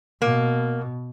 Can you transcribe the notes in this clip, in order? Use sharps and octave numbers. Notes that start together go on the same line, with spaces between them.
B2 A#3